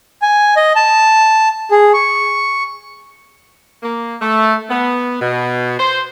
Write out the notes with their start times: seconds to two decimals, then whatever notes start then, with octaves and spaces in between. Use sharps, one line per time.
0.22 G#5
0.56 D#5
0.76 A5
1.71 G#4
1.94 C#6
3.82 A#3
4.21 A3
4.69 B3
5.20 B2
5.77 C5